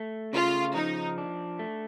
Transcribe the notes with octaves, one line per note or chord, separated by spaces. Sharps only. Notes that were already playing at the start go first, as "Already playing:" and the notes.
Already playing: A3
C#3 F4
F3 D#4
D4
A3